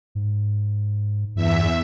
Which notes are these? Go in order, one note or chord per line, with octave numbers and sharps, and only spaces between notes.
G#2
E2 G2 E5